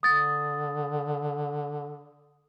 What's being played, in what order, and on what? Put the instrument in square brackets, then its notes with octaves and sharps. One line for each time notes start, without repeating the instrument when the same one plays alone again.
[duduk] D3 [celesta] D#6 A6